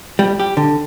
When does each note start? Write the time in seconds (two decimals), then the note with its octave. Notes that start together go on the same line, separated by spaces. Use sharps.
0.19 G3
0.40 G4
0.57 D3